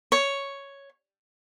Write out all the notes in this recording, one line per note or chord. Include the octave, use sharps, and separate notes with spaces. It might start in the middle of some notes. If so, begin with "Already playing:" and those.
C#5